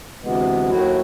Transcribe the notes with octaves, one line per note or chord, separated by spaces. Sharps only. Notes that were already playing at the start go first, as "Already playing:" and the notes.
D2 C3 E3 G#3 B3
D#2 D#3 F#3 A3 E4 F#4